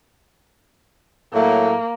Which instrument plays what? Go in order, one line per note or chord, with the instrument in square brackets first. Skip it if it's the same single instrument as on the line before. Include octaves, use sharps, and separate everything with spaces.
[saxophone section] A2 F#3 A3 [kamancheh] A#3